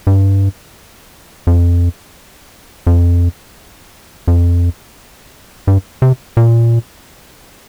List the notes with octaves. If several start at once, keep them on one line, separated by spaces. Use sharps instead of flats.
G2
F2
F2
F2
G2
C3
A#2